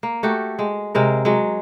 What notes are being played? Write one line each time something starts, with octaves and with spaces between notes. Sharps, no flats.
A#3
A3 F#4 G4
G#3
C3 G#3 A#4
F#3 G#3